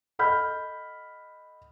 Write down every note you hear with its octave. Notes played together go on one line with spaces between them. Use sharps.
A4 D#5 F#5 B5 F6 G6